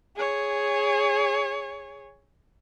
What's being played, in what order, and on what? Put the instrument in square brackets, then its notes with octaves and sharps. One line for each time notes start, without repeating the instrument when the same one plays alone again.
[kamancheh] G#4 C#5